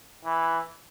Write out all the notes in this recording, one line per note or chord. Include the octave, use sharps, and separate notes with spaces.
E3